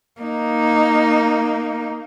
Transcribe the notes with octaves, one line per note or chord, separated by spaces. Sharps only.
A#3 D#4